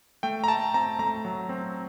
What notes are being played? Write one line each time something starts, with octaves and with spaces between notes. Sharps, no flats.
A3 G5
A#5
A3 A5
C4 A#5
A3 A#5
F#3
C4